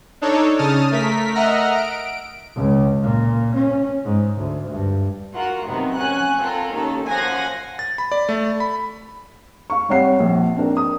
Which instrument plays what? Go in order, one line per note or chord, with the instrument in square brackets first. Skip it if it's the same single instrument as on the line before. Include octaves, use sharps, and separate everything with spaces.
[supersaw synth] D4 D#4 A4 C#5
C#3 A5 D#6 F6
A3 A#4 B6
D#5 E5 F#5 A#5 F6
D7
[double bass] C#2
A#2
C#4
G#2
D2
G2
[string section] F4 F#4 A#4 F#5
F#2 C3 D#3 B3
C#4 F#5 G#5 F#6
C4 F4 A4 A#4
D#2 D#3 C#4 A4
F#2 F3 F5 F#5 G#5 A#6
[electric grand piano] A6
B5
D5
A3
B5
[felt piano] F5 C#6
C3 G3 C#5 F#5 C7
A#1
C4 D4 A#4
D#6